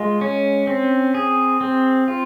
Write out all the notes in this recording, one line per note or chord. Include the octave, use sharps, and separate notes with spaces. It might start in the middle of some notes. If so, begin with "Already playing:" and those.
Already playing: G#3 F4
C#4
C4
G#4
C4
F4